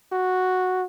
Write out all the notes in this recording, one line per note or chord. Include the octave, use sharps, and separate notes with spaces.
F#4